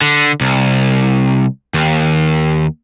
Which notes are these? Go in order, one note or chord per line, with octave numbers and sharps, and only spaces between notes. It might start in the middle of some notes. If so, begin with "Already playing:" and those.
D3
C2
D#2